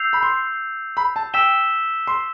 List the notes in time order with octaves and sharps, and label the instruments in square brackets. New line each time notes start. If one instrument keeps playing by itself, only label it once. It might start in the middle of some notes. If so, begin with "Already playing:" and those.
Already playing: [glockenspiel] E6 G6 C7 F7
[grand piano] B5
C6
B5
A5
[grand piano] G5 [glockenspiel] E6 B6 E7 G7
[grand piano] C6